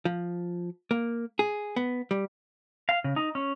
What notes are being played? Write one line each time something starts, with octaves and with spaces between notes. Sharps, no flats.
F3
A#3
G#4
B3
G3
F5
C#3
D#4
C#4